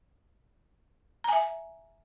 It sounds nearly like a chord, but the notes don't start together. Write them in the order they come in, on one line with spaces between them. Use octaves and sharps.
A#5 G#5 E5